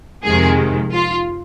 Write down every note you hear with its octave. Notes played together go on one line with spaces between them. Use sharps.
F2 C3 D#3 G#3 G#4
F4